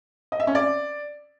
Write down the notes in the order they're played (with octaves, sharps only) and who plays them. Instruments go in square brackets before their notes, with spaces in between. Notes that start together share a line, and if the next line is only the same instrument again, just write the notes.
[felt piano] D#5
E5
C#4
D5